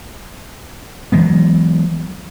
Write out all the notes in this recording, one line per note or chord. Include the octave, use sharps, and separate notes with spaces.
E3 F#3 G#3 B3